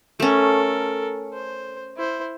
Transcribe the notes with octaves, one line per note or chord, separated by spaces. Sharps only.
A3 C#4 A4 A#4
C5
E4 C5